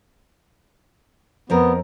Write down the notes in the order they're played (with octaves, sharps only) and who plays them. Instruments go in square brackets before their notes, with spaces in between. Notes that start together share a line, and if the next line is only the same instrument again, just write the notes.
[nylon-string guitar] F2 C4 A#4 [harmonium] B3